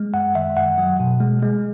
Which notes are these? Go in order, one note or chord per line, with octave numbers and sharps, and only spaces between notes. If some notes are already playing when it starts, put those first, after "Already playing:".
Already playing: G#3
F#2 F#5
D#3 E5
F#2 F#5
F#3
B2
G#3
G#3